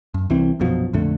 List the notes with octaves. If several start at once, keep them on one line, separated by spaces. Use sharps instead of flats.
F#2
C2 E3 C4
A#1 F#2 B2 F3
A#1 F2 D3 A3